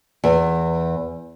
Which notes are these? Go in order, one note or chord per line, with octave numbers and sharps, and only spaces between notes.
E2